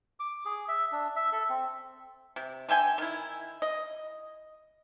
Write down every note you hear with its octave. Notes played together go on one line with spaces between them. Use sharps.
D6
G#4
E5
D4
E5
A4
C4
C3
D3 E5 G5 G#5
D#3 E4
D#5